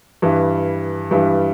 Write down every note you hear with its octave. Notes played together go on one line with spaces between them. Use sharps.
G2 E3 G3
G2 E3 G3